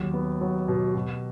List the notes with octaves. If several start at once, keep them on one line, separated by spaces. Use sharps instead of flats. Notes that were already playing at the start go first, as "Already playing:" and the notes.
Already playing: D#2 F#3
B3
F#3
B2
B2